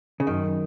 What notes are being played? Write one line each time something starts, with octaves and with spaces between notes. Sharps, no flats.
C#3
F#2 D#3